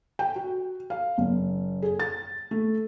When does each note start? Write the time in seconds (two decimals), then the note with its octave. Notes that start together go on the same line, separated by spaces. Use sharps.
0.19 G5
0.36 F#4
0.90 F5
1.18 F#1
1.82 G#4
2.00 A6
2.51 A3